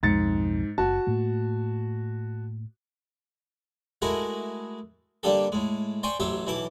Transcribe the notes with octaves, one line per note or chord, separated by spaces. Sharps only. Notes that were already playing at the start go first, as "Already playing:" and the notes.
B1 F2 G#2 A6 C#7
F#1 F#4 A5
A2 A3 A#3
G#3 A3 E4 F#4 G#4 A#4
D3 G3 A#3 D4 G4 A4
A2 G#3
C5 D5 G5 G#5 C6 C#6
A1 F#3 G4 C5 E5
B1 E3 E4 A5 D6